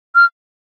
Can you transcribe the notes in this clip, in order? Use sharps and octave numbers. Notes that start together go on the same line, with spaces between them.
F6